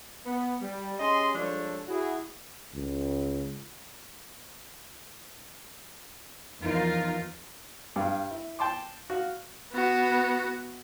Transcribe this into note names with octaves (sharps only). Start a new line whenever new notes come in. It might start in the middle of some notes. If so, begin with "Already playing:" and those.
B3
G3
C#4 G4 G#4 D#5 C6
F3 G3 G#3 D4 A4 C#5
E4 F#4 G#4
C#2
E2 F3 D#4 F4 A#4
G2 G4 F5 D6
E4
G5 A5 C6 D6
F#4 F5
B3 F#4